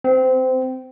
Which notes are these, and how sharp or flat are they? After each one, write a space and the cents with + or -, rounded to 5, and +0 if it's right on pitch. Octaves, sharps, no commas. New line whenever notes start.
C4 -20